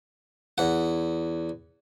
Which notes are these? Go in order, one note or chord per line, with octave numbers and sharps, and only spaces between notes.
E2 F#5